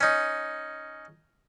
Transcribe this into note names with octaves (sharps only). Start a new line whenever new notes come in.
C#4 D#4